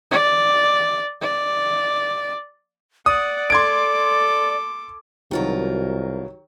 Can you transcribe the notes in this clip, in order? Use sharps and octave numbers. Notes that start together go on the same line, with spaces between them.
D5
D5
D5 F#5 D#6
A4 C6 D6 G#6 D7
C2 B2 D#3 F#3 F4 G4 A#4 C#5